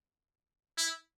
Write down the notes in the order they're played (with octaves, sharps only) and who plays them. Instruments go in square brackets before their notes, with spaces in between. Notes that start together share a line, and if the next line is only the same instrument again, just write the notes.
[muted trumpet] E4